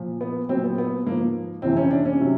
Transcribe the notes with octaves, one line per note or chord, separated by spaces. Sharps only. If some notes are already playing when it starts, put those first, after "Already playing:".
Already playing: A#2 F3
B3
A#2 F#3 C4
B3
B3
G#2 F3 A#3
F2 C3 E3 C4
C#4
D4
C#4
C3 D#3 F#3